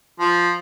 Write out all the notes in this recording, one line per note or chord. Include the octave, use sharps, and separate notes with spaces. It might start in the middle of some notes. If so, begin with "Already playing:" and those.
F3